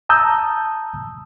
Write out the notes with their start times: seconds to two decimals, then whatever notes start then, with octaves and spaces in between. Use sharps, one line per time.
0.09 A5 A#5 D#6 E6 G6